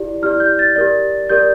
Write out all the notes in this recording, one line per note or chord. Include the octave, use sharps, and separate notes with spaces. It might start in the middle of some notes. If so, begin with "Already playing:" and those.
Already playing: E4 G4 D5
E4 G4 D5 F6
G6
A6
G4 A#4 D5
G4 A#4 D5 G6